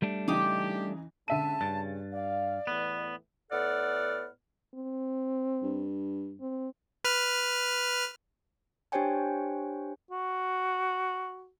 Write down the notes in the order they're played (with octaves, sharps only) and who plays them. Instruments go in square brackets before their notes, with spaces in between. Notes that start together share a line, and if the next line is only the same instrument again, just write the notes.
[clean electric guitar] G3 A3 D4
[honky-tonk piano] C#3 E3 D#4 [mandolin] F4 D6 D#6 [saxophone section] G4
[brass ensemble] G#2 G#3 C#4 [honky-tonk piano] D3 E5 D#7 [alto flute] A5
[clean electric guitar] G2 [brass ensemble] C#3 [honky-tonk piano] A6
[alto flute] D5 [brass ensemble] F5
[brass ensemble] E2 A2 E3 [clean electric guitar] B3
[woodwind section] A2 B3 A4 D5 F#5 F6
[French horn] C4
[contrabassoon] G2
[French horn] C4
[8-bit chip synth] B4 F6
[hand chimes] D4 G4 C5 C#5 G5 G#5
[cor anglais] F#4